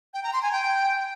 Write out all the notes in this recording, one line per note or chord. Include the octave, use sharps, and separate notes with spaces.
G5
A#5
C6
G#5
G5